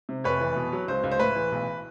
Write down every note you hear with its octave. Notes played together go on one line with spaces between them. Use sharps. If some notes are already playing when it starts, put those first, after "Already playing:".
C3
F1 B4 C#5
E3
B2
F#3
C#2 C5
C#2
C5
A2 B4
E3
B1